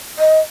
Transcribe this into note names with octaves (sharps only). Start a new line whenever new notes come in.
D#5